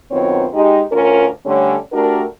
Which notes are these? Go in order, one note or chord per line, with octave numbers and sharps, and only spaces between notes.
F#2 D#3 B3 C4 F4 C#5
G#3 D#4 G4
D2 C#4 F4 A#4
D3 G3 A3 C#4
A3 D4 F#4 G4 A#4